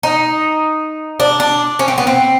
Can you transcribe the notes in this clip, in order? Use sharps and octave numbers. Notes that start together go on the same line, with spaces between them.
D#4
D4
D4
C#4
C4
B3
C4